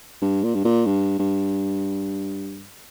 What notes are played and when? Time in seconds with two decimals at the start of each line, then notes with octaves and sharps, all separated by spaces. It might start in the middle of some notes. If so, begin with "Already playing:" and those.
0.21 G2
0.43 A#2
0.55 G2
0.64 A#2
0.86 G2
1.19 G2